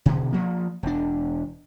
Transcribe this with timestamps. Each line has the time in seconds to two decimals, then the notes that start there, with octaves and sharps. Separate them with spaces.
0.06 B2 D3
0.33 F3 A#3
0.83 E1 D4